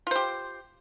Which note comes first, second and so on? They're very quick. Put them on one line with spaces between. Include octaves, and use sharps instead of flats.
F4 C5 G4